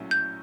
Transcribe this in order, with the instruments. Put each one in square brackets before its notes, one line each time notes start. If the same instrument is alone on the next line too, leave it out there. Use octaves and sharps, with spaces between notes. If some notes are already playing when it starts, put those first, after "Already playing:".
Already playing: [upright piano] A#1 A2 F#3 A3 C#4
[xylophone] G6